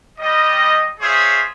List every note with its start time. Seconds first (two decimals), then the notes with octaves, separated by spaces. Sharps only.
0.18 G3 D#5
1.01 F4 G#4 C5 C#5 E5